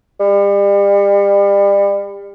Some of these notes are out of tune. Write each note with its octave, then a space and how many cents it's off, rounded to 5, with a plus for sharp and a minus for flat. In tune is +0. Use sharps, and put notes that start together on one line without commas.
G3 +35